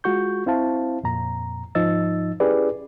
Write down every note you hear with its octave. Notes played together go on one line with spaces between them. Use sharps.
G#3 F4 F#4 C#6 G6
C4 E4 C5 F5 A5
F2 A#2 A#5
G#2 F3 D#4 D#5 E6 A6
C#4 E4 G4 G#4 B4 D5